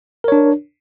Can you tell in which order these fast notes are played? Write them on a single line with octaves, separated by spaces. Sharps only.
A#4 C#5 D4